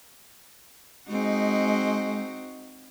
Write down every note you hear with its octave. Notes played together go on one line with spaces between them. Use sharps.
G#3 C4 D#4 F#4